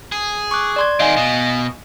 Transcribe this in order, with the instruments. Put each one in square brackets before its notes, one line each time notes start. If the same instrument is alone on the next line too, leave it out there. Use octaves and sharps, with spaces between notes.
[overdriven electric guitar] G#4
[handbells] C#6 D6 F#6
D5 C6 G#6
[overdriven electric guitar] D#3 G#3 [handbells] D#5 F5 G#5
[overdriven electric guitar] B2